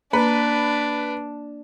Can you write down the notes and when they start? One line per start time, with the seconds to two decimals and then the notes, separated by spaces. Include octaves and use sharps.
0.13 A#3 D4 B4